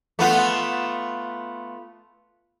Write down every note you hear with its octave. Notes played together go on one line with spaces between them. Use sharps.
A3 B3 F4